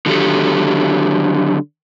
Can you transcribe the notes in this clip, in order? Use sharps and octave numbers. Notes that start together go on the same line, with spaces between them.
D3 D#3 F#3 F#4 G4 A4